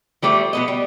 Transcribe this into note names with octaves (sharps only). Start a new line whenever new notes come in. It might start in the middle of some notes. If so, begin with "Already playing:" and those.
F3 G3 A3 D5
B2 B3 D#5
G3